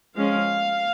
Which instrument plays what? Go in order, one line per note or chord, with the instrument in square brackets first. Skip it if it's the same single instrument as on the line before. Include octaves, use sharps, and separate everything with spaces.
[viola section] F3 G#3 C#4 F5